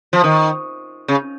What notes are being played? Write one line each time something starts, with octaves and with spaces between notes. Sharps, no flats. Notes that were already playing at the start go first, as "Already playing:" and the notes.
F3
D#3
C#3